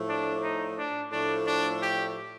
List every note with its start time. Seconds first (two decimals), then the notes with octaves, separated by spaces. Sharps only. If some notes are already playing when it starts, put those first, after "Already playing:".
Already playing: A2 F3 A3
0.09 D4
0.43 D#4
0.77 D4
1.11 A2 F3 A3 D4
1.46 D4
1.80 G4